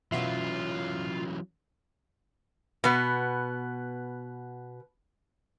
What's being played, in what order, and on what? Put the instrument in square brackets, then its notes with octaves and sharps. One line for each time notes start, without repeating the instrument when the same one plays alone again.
[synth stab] B2 E5 [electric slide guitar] E3 F#3 C#4 [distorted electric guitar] F4
[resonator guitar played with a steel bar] B2 B3